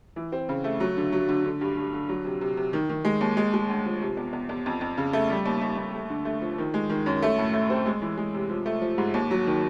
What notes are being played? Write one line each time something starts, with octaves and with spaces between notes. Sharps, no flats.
E3
C4
C#3
A3
F#3
D3
F#3
D3
D3
G2
G2
D3
F#3
C3
C3
C3
D#3
D#3
G#3
D#2
G#3
G#3
D2
F3
C3
E2
E2
E2
F2
F2
C#3
A3
G3
D#2
D#2
D#2
A3
D3
A3
F3
D#3
G#3
D#3
F#2
A3
A2
A3
C4
G#3
E3
G#3
C3
F3
A3
F3
G#2
D#2
F#3
D#3